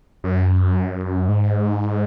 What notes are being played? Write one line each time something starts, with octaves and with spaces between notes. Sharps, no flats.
F#2
G#2